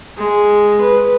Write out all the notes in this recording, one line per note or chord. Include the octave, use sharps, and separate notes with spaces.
G#3
B4